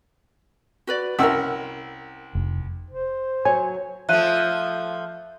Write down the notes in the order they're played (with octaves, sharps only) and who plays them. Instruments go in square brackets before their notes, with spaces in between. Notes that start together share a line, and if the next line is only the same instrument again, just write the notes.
[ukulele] F#4 B4 D5
[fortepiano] C2 F#5 E6 [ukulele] C#4 A#4
[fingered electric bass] F1
[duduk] C5
[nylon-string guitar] F#3 C#5 [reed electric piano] G#5
[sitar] F3 A3 [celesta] E5 F#6 D#7